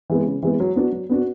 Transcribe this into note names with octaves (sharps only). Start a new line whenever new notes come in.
E3 G#3 B3
C#3
E3 G#3 B3
F#3
B3 D4 F#4
F#3
B3 D4 F#4